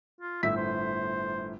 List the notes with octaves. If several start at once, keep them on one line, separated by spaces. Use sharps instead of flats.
F4
G1 A2 E5 B6
C5